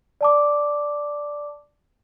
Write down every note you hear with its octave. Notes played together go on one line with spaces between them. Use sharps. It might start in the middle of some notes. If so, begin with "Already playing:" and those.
D5 A5 D6